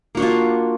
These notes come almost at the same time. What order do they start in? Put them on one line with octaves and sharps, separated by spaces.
A#3 F#4 D4 F4